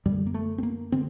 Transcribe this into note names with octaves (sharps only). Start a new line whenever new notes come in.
F#2 D3 G3
A#3
A3
C4
A#3
D3 C4